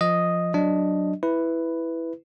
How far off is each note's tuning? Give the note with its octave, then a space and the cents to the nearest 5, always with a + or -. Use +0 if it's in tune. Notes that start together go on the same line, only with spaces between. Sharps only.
F3 +0 D#5 +0 D#6 +0
F#3 +0 D4 +0 D#5 +0
E4 +0 B4 +5